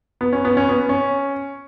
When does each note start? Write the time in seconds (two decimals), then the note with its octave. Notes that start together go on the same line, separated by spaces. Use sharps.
0.21 B3
0.33 C#4
0.45 B3
0.57 C#4
0.69 B3
0.89 C#4